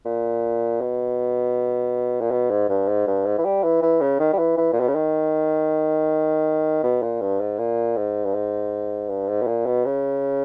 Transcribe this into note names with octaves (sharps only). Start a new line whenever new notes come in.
A#2
B2
A#2
B2
G#2
G2
G#2
G2
G#2
E3
G3
E3
E3
C#3
D#3
G3
E3
E3
A#2
B2
C#3
D#3
B2
A#2
G2
G#2
A#2
G#2
G2
G#2
G2
G#2
B2
A#2
B2
C#3